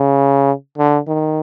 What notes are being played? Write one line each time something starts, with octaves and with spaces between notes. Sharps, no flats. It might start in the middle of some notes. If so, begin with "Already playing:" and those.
Already playing: C#3
D3
D#3